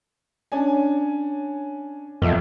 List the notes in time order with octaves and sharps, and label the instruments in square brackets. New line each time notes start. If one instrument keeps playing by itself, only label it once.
[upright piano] C#4 D4 G#5
[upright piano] B1 E5 [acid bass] F2